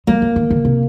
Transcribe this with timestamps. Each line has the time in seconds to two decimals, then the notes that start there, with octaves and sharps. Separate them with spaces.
0.07 G#3 A#3
0.22 F3
0.36 D#3
0.50 D3
0.65 C3